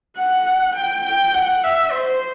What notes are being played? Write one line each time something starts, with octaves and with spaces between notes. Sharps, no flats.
F#5
G5
G5
F#5
E5
C5